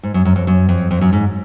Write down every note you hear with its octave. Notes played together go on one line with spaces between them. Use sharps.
G#2
F#2
F#2
F2
F#2
F2
F2
F#2
G#2